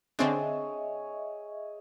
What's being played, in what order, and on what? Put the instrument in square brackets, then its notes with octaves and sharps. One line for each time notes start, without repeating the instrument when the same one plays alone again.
[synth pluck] D3 C4 D4 [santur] G#4 C#5 [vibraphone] D#5 E5